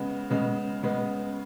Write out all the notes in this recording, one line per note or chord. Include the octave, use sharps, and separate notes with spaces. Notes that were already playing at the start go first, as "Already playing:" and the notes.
Already playing: C#3 G#3 B3
C#3 G#3 B3
C#3 G#3 B3